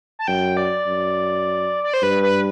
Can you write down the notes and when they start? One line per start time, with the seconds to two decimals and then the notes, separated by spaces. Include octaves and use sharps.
0.19 A5
0.28 F#2 G5
0.57 D5
0.87 F#2
1.84 D5
1.94 C5
2.03 G2 B4
2.23 B4